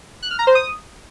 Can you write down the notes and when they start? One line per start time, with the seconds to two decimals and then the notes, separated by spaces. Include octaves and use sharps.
0.22 F#6
0.31 F6
0.39 A#5
0.47 C5
0.55 D#6